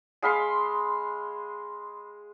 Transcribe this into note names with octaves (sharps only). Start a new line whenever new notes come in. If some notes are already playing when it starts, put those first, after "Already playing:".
G#3 F5 B5 C6